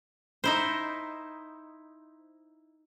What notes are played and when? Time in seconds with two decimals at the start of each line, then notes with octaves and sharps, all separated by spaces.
0.44 D#4 E4 C5